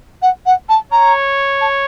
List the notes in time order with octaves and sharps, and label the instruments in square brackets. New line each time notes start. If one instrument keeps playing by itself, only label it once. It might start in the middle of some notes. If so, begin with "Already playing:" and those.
[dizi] F#5
F#5
A5
[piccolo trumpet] C#5 [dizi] A#5
[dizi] A5